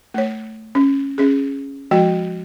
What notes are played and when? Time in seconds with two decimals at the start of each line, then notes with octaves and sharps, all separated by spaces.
0.14 A3 C#5
0.75 C#4
1.18 C#4 G#4
1.91 F3 G#3 F#4 G5